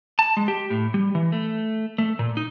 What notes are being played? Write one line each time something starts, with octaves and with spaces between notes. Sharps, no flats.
A5
G#3
G4
A2
G3
E3
A3
A3
A#2
D#4